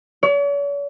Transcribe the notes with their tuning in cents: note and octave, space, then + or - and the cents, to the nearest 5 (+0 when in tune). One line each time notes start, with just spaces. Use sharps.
C#5 +45